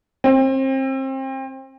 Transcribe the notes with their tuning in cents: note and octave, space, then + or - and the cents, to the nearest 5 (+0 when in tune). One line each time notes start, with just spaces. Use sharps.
C4 +30